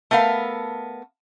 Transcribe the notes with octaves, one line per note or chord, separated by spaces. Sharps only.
A3 B3 A#4 F5